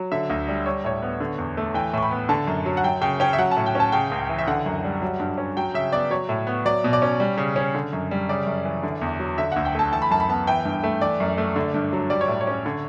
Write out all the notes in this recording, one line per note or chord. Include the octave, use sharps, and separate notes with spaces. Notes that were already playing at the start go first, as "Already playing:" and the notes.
Already playing: F#3
D3 E5
D2
G3
G3 C#5
A2 C#5
B3
D3
E2
A3
E3 G5
A2 C#6
B5
B3
D3 A5
F#2
F#3
F#5
F#3 G5
C#3 G5
C#4 G5
E5
F#3 F#5
A5
A2
G5
C#4 A5
C#3 G5
C#2
E3
E5
D3 F#5
F#2
G3
F#3
G2
C#4
F#3 G5
C#3 E5
B3 D5
F#3 C#5
A2
B3
F#3 D5
B2
D5
C#4
G3
C#3
C#4
D3
F#2
G3
C#3 D5
F#2
E3
D3
E2
F#3
D3 E5
D2 F#5
G5
A3 A5
E3 A5
B5
F#2 A5
B5
B3 A5
E3 G5
G2
A3
E3 D5
F#2
A3
D3
G2
F#3
G3 D5
C#5
A2
C#5
C#4
D3